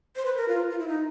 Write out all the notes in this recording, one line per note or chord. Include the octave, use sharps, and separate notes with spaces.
C5
B4
A#4
F4
F4
E4
D#4